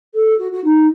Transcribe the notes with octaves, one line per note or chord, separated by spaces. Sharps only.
A4
F#4
F#4
D#4